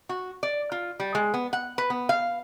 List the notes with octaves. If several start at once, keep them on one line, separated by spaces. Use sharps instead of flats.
F#4
D5
F4
G3
G#3
B3
F#5
B4
B3
F5